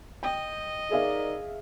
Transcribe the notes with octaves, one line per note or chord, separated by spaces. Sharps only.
D#5 G5
D#4 G#4 A#4 D5 E5 F5